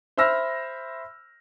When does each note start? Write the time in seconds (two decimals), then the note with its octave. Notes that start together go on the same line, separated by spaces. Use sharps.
0.17 C5 E5 B5 E6 F6 A#6